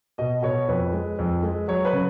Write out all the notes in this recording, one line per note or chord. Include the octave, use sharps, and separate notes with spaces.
B2 D#5
B2 C#5
F2 B4
G#3
F2
G#3
F#3 C#5
B4
C#3